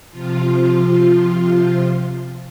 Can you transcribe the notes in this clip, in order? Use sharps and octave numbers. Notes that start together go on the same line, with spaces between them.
C3 F3 F4